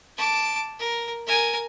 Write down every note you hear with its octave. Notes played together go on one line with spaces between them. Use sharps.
A5 D6
A#4
A#4 G#5